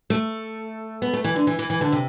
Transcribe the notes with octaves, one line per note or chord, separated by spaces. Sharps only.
A3
B3
A3
E3
D3
E3
E3
E3
D3
C3